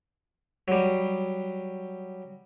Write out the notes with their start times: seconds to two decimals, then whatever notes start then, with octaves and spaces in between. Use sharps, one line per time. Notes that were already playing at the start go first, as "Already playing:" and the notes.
0.68 F#3 G3